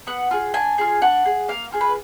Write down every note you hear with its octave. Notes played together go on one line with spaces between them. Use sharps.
B3 F#5
F4 G#4
D4 G#5
F4 G#4
D4 F#5
G#4
A#3 F5
F4 G#4
B4